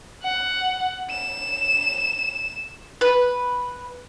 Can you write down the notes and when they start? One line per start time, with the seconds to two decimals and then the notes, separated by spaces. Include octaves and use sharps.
0.24 F#5
1.10 E7
3.01 B4